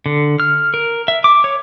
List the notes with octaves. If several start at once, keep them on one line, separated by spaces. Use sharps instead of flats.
D3
F6
A#4
E5
D6
C#5